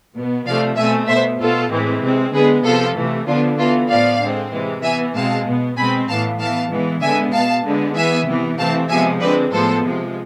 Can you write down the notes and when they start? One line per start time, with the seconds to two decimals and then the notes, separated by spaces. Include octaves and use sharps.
0.16 B2 B3
0.46 C3 F3 A3 D5 F5
0.77 B2 A3 C4 E5 G#5
1.08 B2 B3 C5 E5
1.40 B2 B3 F4 A4
1.71 A2 E3 G#3 C4
2.02 C3 G#3 C4
2.33 D3 G#3 B3 G#4 B4
2.64 C3 F3 B3 F4 A4
2.95 C3 E3 A3
3.27 D3 F3 B3 D4 F4
3.58 E3 B3 F4 A4
3.90 A2 F3 B3 D5 F5
4.21 D3 G#3 C4
4.53 C3 E3 G#3
4.83 E3 B3 E5 G#5
5.15 B2 G#3 C4 F5 A5
5.47 B2 B3
5.77 B2 G#3 C4 G#5 B5
6.08 A2 E3 B3 F5 A5
6.39 E3 B3 F5 A5
6.71 E3 G#3 B3
7.02 D3 G#3 B3 E5 G#5
7.33 B2 B3 F5 A5
7.64 D3 G#3 B3
7.95 E3 B3 E5 G#5
8.27 C3 E3 B3
8.58 C3 E3 A3 C4 F5 A5
8.89 C3 F3 G#3 B3 E5 G#5
9.21 D3 G#3 C4 B4 D5
9.52 A2 F3 G#3 B3 A4 C5
9.83 C3 F3 G#3